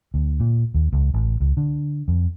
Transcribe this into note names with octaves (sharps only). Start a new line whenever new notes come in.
D2
A#2
D#2
C#2
A1
C#2
D3
F2